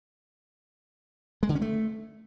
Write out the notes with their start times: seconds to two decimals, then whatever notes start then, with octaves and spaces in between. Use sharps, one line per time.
1.43 G#3
1.49 D3
1.55 C#4
1.62 A3